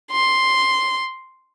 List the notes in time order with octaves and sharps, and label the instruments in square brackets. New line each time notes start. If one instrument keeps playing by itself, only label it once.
[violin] C6